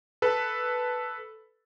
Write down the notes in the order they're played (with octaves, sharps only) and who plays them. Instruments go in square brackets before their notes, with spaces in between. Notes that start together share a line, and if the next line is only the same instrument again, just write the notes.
[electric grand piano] A4 B4